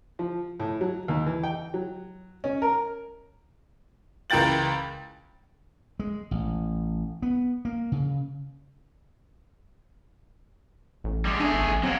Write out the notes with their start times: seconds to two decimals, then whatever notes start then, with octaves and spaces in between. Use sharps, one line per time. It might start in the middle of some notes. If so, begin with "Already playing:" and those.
0.19 F3
0.60 A2
0.81 F#3
1.08 D#2
1.26 E3
1.44 G5
1.74 F#3
2.44 C#4
2.62 A#4
4.30 C#2 E3 A#4 G5 A6 F#7
6.00 G#3
6.31 A1
7.22 B3
7.65 A#3
7.92 C#3
11.04 A1
11.25 G3 G#3
11.40 A3 D4 G#4
11.53 G#1
11.68 A1
11.83 F#3 A#3 C4